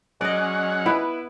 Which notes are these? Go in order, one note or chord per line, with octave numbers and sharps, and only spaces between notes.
F#3 G#3 C#4 D5 D#5 F#5
B3 E4 B4